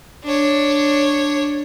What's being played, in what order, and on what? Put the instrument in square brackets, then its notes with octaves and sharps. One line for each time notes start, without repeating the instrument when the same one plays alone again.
[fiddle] D4 C#5